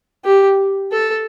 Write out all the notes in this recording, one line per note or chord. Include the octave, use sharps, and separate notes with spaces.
G4
A4